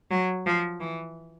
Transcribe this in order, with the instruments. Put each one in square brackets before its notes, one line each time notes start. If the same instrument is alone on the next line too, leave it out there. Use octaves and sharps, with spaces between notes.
[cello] F#3
F3
E3